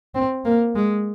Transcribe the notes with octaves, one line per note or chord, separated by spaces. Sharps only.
C4
A#3
G#3